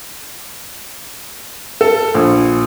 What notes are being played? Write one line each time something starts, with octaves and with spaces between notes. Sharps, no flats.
A4
A#1